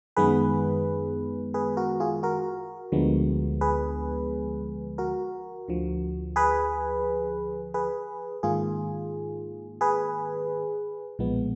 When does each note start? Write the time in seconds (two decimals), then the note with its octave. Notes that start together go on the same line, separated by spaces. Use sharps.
0.16 F#2 D#3 G#3 B3 G#4 B4
1.54 G#4 B4
1.77 F#4 A#4
2.00 F4 G#4
2.23 F#4 A#4
2.92 D2 D3 F3 G#3 B3
3.61 G#4 B4
4.98 F#4 A#4
5.68 D2 D3 F3
6.36 G#4 B4
7.74 G#4 B4
8.43 G#2 D#3 A#3 F4 G#4
9.81 G#4 B4
11.19 B1 A#2 F3 G#3 B3